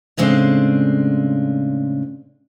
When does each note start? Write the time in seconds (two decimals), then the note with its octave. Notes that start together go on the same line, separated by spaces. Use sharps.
0.17 A2 C#3 G#3 C4 D4